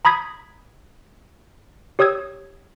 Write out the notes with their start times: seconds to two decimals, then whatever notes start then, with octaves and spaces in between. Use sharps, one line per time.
0.05 A#5 B5 D#6 G#6 B6
1.99 G4 C#5 D#6 E6 G#6